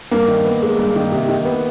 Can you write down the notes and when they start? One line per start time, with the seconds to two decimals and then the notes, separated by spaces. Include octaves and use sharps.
0.11 G2 A#3
0.28 D#3
0.45 B3
0.62 G#3
0.79 G2
0.96 D#3
1.12 C3
1.29 D#3
1.45 B3